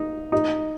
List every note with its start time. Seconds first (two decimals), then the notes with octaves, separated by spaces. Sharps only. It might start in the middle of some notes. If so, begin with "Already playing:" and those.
Already playing: D#4
0.32 D#4